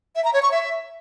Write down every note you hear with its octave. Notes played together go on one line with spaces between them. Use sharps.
E5
A#5
C#5
C#6
E5